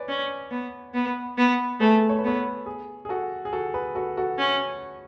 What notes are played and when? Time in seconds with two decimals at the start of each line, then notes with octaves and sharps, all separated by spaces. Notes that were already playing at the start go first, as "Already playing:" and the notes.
Already playing: B4 C#5 D5 G#5
0.08 C#4
0.51 B3
0.94 B3
1.37 B3
1.80 A3 G#4 B4
2.09 C#5
2.19 B4
2.24 B3 A4 C#5
2.66 G#4
3.05 G#4
3.09 F#4 A4
3.45 G#4
3.53 F#4 A4
3.74 G#4 B4
3.95 F#4 A4
4.17 F#4 A4
4.38 C#4